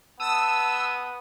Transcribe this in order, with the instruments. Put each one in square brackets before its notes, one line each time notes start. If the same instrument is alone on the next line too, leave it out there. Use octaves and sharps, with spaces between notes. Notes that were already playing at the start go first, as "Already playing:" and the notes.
[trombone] B3 [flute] A5 [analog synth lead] D#6 [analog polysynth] E6